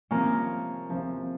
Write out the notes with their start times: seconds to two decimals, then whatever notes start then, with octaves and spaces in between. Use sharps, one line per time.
0.11 C3 F3 A#3 C4 C#4 F4
0.89 C3 F3 C4 F4